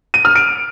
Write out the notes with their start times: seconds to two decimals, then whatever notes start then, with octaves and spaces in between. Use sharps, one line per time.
0.14 D#7
0.25 F6
0.36 D7